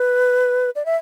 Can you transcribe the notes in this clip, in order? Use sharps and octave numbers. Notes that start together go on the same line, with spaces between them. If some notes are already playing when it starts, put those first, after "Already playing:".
Already playing: B4
D5
E5